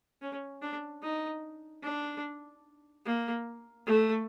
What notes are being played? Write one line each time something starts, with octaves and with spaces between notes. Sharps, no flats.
C#4
D4
D#4
D4
A#3
A3